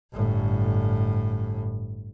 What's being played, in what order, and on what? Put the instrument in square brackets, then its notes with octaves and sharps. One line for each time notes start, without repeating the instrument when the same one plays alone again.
[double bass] G1 A2